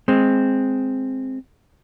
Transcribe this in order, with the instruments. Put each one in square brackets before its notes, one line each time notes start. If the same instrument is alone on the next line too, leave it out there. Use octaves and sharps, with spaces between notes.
[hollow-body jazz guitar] G#3 C4